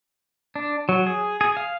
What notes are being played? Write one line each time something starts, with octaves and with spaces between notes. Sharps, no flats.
D4
F#3
G#4
G#4
F5